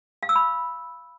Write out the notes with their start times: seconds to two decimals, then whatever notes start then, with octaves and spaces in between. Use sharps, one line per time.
0.23 F5
0.29 E6
0.36 B5